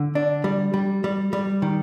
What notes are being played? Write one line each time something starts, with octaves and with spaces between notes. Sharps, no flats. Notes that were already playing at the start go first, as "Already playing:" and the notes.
Already playing: D3
D4
G3
G3
G3
G3
D#3